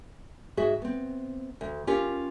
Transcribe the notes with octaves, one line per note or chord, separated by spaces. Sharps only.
G#2 F#4 G#4 E5
B3 C4
D2
C#4 F4 G4 A#4